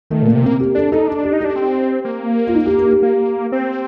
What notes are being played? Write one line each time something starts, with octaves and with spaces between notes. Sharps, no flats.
D#3 A3
A#2 A#3
C3
A#3 C4
G4
D4 A4
D#4 A4
D4
G4
D#4
D4 G4
C4
A#3
F4
D#4
G4
G4
G4
A#3
C4